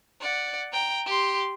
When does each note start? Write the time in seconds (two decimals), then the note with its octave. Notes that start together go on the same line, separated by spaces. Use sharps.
0.21 D5 F#5
0.73 G5 A#5
1.06 G4 C6